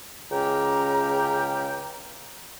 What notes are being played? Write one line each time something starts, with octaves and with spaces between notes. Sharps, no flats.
C#2 C#3 C#4 G4 G5 A#5